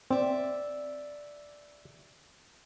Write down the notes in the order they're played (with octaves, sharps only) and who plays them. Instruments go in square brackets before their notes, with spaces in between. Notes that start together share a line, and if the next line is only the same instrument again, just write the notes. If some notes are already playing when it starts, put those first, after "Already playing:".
[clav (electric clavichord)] C4 [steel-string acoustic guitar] D5 E5